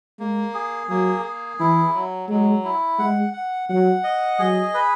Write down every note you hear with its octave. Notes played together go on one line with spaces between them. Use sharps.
G#3 A#3
G#4
F#3 A#3
G#4
E3 E4
F#3
F#3 G#3
E4
G#3 F#5
F#5
F#3 F#5
D#5
F#3 G#4
B4